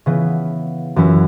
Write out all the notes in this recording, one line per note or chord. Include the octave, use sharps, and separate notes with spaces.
C#3 E3 B3
F#2 E3 C#4 E4